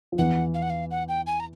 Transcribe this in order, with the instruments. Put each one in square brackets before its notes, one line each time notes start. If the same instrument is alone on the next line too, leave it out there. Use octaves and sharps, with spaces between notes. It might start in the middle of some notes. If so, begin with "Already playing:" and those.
[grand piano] F3
[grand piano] E2 E3 [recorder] F#5
[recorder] F5
F#5
F5
F#5
G5
G#5
A#5